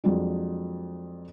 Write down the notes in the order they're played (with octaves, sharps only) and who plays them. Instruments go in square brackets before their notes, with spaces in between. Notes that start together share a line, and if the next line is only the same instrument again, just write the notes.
[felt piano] F2 F#3 G#3 D4